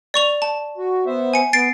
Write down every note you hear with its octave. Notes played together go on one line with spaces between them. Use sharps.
D5 C#6 F7
A5
F#4
B3 C5 E5
G#5 C#7
B3 A6 C7 D7